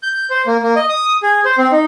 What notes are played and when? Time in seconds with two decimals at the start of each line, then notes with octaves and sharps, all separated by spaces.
0.03 G6
0.30 C5
0.47 A#3
0.62 A#3
0.76 D#5
0.89 D#6
1.23 G#4
1.45 C5
1.58 C4
1.72 D#4